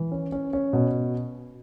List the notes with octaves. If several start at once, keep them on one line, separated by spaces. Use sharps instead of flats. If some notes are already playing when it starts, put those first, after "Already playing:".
Already playing: E3
C#4
C#4
C#4
B2